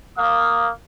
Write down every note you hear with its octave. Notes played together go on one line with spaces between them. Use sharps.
A#3 F5 D#6